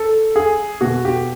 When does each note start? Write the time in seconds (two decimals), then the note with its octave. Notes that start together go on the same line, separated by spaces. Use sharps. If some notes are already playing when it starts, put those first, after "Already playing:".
Already playing: A4
0.36 G#4
0.81 B2 F#4
1.05 G4